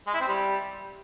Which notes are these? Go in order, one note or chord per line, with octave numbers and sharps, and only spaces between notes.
G#3
E4
C4
G3